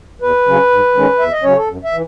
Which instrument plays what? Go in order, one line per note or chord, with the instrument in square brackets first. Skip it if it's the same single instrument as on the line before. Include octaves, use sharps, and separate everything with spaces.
[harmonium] E2 B4
C#3 F#3 C#4
G#2
D#3 G#3 C#4
E2 E5
D#5
C#3 F#3 C#4 C#5
A4
F#2
E5
E3